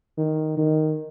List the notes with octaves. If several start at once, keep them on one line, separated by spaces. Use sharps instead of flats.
D#3
D#3